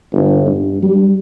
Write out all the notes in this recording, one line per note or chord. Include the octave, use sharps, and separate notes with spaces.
G1
G2
G3